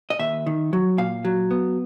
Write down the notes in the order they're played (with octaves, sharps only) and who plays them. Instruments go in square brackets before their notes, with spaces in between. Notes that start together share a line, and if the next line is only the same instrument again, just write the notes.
[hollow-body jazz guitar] D#5
D#2 E5
D#3
F#3
A#2 F5
F#3
B3